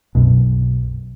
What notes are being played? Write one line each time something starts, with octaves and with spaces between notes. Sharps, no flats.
B1 F#2 B2